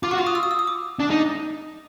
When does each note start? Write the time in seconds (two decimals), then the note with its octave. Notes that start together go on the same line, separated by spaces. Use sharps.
0.03 F4 D6
0.11 F#4 C#6
0.18 F4 D6
0.27 D#6
0.35 E6
0.43 D#6
0.51 E6
0.59 D#6
0.67 D6
1.00 D4
1.10 D#4